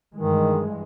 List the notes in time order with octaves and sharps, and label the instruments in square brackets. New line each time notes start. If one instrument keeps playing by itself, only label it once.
[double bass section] G2 E3 G#3 [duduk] D#3